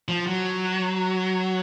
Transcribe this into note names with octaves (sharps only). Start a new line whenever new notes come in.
F3
F#3